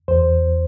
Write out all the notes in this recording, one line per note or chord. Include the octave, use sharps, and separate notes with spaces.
E2 C5